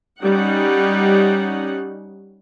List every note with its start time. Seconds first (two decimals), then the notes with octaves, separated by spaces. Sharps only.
0.23 G3 C#4 D#4 F#5